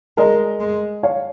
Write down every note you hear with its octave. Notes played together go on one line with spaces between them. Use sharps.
G#3 A#4 D#5
G#3
C#5 F5